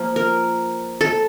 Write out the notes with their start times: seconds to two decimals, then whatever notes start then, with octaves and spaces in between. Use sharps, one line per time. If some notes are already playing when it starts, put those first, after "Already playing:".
Already playing: F3 A#3
0.16 A#4
1.01 A4